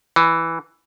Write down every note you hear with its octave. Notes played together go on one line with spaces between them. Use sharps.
E3